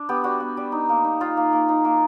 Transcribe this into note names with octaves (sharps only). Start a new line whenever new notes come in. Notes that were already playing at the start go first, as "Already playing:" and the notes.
Already playing: D4
B3 G4
G3 F#4
B3
G3
D#4
A#3
D#4
D#4 F4
A#3
A#3
D#4
A#3